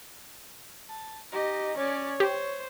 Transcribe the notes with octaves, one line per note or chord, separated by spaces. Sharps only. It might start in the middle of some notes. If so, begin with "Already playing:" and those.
A5
D#4 G4 D#5
C#4 C#5 D5
G4 C5